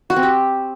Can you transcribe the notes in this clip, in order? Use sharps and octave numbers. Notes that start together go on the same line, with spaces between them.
F#4
C4
G4